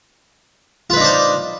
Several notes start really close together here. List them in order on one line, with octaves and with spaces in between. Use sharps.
F4 B4 D#4 D4 C5